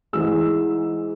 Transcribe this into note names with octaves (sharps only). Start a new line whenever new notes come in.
G#2 E3 G#3 E6